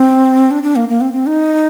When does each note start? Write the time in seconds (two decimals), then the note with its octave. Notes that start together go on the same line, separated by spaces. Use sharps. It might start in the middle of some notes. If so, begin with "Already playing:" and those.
Already playing: C4
0.51 D4
0.63 D4
0.76 A#3
0.89 A#3
1.01 C4
1.13 C4
1.26 D#4